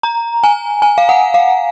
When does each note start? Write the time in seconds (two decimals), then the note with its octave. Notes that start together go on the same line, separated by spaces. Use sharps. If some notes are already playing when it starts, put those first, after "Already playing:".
0.03 A#5
0.44 G#5
0.82 G#5
0.98 F5
1.09 F#5
1.34 F5